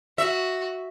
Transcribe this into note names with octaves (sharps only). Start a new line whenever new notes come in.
F#4 E5